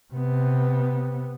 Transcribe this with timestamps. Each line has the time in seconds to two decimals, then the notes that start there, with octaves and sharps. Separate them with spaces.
0.13 C3 B3